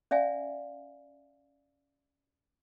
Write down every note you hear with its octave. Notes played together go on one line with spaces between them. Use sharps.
C#4 D5 E5 F5 G#5